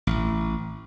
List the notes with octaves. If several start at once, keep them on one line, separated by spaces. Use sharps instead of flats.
A1